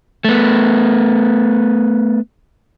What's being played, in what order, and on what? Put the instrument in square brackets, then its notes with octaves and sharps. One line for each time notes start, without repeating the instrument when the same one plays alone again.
[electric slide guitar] A3 B3